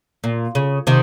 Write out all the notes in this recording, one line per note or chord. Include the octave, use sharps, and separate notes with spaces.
A#2
C#3
C3 D#3